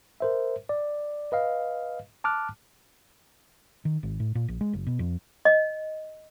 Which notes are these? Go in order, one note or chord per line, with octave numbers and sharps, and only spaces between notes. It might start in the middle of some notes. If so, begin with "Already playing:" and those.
A#4 C5 E5
D5
B4 D#5 F5
A5 D6 F6 F#6
D#3
G#1
A2
A#2
A#1
G#3
F#1
B2
F2
D#5